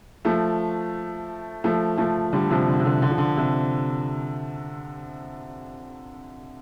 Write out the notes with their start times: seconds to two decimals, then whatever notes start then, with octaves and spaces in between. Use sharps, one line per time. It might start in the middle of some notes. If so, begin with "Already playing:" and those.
0.25 F3 A3
1.64 F3 A3
1.98 F3 A3
2.33 D3 G3
2.51 C3 F3
2.68 D3
2.79 C3
2.85 D3
3.02 D3
3.10 F3
3.18 D3
3.37 C3